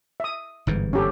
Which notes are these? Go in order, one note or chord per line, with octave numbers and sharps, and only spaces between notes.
E5 D#6
G1 G#2 E3
C#4 G4 A4